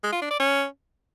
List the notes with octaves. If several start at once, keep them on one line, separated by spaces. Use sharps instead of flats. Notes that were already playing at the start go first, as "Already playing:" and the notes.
G#3
F4
D4
D5
C#4